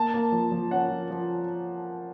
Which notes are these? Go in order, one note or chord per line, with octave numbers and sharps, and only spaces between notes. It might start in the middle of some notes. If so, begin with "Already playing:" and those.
Already playing: A#3 A5
A#3
F3
F3
C#4 F#5
F3
F3